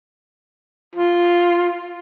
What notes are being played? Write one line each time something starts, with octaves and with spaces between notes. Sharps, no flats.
F4